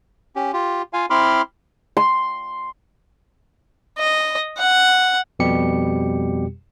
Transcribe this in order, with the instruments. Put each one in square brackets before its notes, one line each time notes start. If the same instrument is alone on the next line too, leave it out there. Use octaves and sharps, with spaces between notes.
[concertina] C#4 G4
F4 G4
F4 F5 G#5
C4 E4 B5 C6 D6 F6
[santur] C6
[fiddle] D#5
F#5
[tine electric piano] F2 B2 G3 G4 C#7